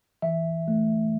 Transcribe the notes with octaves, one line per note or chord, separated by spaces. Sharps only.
E3 E5
A3